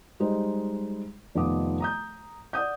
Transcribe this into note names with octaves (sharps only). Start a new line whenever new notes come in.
G3 G#3 D#4 C5
F1 D#3 F3 B3 D6 D#6
A#5 D#6 G6
D5 F#5 D#6 G6